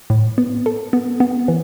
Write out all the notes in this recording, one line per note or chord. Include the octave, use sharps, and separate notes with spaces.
A2
B3
A4
B3
B3
E3